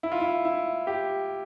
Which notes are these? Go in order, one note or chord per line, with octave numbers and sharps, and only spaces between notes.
E4
F4
E4
E4
G4